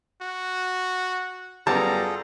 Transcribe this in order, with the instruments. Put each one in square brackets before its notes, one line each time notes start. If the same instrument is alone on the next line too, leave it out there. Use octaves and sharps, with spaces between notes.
[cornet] F#4
[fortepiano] F#2 B3 A5 [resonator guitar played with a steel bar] G3 [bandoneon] F4 G#4 A4 [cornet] A#5